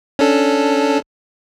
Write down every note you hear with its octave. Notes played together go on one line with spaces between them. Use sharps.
C#4 D4 A4